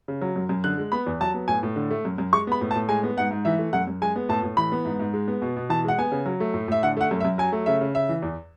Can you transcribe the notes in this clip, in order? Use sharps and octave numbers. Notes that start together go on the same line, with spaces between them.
C#3
F#3
F#2
F#2
D3 F#6
G#3
B3 B5
E2
F#3 A5
B3
A2 G#5
A2
D3
A3
F#2
F#2
G#3 C#6
B3 B5
A2
A5
A2
G#3 G#5
B3
G#2 F#5
G#2
E3 E5
A3
F#2 F#5
F#2
G#3 G#5
B3
A2 A5
A2
E3 B5
B3
G#2
G#2
G#3
B3
B2
B2
E3 A5
G#3 F#5
B3 G#5
C#3
F#3
A3
A2
A2 E5
D3 F#5
A3 F#5
F#2
E5
F#2
F#3 G#5
A3
C#3 E5
C#3
C#3 E5
E3
E2